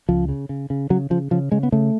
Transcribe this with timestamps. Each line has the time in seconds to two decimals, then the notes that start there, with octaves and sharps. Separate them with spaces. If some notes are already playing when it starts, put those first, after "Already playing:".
0.08 C#2 F3
0.29 C#3
0.49 C#3
0.70 C#3
0.90 C#3 F#3
1.10 C#3 F3
1.31 C#3 F3
1.52 C#3 G#3
1.63 B3
1.72 C#3 A3